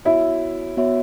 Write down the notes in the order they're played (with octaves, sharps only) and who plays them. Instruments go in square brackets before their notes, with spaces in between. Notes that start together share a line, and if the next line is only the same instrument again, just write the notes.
[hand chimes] B3 F#4 C#5 E5 [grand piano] E4
[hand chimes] B3 F#4 C#5 E5